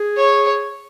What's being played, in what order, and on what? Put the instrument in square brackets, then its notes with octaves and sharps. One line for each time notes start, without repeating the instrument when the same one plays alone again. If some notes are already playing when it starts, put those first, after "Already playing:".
Already playing: [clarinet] G#4
[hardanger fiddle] C#5